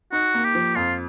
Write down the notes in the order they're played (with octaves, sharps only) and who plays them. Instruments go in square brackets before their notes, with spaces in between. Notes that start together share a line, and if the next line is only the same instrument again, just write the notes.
[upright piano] D#4 [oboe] F#4
[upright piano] A#3
[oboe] G4
[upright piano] F3
[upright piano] F2 [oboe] F4